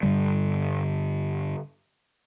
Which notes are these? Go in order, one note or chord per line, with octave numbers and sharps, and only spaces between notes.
G2 D3 G3